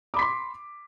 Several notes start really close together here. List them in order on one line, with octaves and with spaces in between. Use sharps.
D6 B5 B6 C6